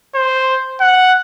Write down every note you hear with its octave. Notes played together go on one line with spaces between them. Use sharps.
C5
F#5